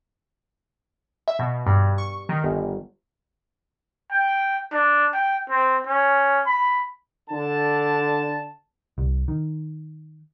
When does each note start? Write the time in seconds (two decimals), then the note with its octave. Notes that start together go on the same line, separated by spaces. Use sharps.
1.28 E5
1.39 B2
1.67 G2
1.98 C#6
2.29 D#3
2.44 G1
4.12 G5
4.72 D4
5.14 G5
5.50 C4
5.86 C#4
6.47 B5
7.30 D3 A5
8.98 C2
9.28 D#3